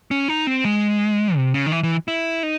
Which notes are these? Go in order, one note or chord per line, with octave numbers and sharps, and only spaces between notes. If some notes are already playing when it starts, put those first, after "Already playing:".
C#4
D#4
C4
G#3
C3
C#3
D#3
E3
E3
E4
D#4